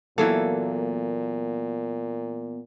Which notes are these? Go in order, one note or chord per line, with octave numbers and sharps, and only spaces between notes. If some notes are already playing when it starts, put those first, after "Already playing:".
A#2 E3 F#3 A#3 B3 A4